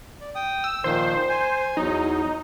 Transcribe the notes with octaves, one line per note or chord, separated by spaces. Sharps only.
D5
G5 D#6
E6
A#2 D#3 F3 C5
G#5
E2 F#3 D#4